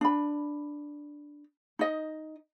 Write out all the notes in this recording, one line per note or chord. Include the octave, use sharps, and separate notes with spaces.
D4 B5
D#4 D#5